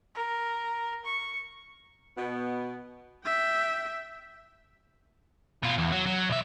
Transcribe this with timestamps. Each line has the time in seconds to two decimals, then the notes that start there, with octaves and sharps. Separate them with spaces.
0.15 A#4
1.05 C#6
2.17 B2 B3
3.25 E5 G5
5.63 B2 F4
5.78 E2
5.92 F#3
6.06 F#3
6.29 B1 E5